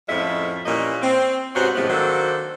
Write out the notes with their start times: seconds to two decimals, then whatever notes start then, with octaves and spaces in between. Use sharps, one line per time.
0.09 F2 A2 F3 G#3 C#4 E5
0.66 A#2 E3 G3 A#3 C#4 D#5
1.02 C4
1.55 G#2 C3 B3 C#4 F#4 C5
1.75 A2 C3 D#3 F3 G#3 B3
1.90 D#3 F#3 A#3 D4 A4 C5